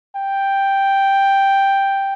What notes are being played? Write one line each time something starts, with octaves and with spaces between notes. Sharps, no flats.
G5